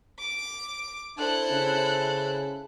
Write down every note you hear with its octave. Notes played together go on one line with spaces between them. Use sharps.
D6
D4 E4 A4 C5 F#6
C#3